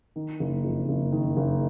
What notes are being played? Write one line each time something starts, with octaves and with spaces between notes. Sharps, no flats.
D#3
F#1
F2
F#1
D#3
F#1